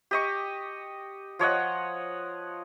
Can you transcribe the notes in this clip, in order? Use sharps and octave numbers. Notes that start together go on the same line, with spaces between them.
G4 D#5 C#6
F3 C#5 D#5 F#5